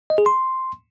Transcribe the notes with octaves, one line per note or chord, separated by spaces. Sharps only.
D#5
G#4
C6